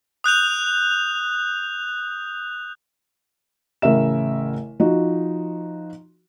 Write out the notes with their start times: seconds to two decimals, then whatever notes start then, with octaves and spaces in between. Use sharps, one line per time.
0.24 D#6 F#6 G6 F7
3.82 A1 C#3 A#4 E5 E7
4.80 F3 D#4 F#4